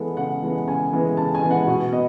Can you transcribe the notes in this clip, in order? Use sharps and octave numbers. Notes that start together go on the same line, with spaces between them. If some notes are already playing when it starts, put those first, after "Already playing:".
Already playing: E3 G#3 B3 A4
C#3 F#5
E3 G#3 B3
C#3 G#5
E3 G#3 B3
C#3 A5
G#5
E3 G#3 B3
F#5
B2 F#5
B3 D#5